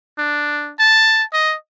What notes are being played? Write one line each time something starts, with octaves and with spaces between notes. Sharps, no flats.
D4
A5
D#5